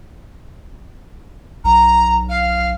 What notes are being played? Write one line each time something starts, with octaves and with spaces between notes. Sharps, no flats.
B1 A#5
F5